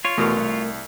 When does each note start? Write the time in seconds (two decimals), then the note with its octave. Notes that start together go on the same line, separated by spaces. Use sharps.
0.05 F4 C#5
0.18 E2 B2 A3 A#4
0.37 C2